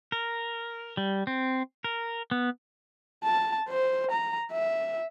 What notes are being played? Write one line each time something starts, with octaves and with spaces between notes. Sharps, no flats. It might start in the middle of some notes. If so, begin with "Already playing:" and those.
A#4
G3
C4
A#4
B3
A5
C5
A#5
E5